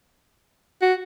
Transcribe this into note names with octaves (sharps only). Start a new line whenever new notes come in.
F#4